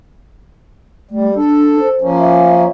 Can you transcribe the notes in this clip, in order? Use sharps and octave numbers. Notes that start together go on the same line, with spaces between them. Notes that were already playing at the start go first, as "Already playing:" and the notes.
G3 A3
D4 A4
C5
F3 A#3 C#4
E5